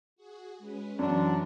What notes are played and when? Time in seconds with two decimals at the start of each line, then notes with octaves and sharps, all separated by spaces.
0.16 F#4 G#4
0.59 G#3 C#4 B4
0.99 F#2 E3 F#3 D4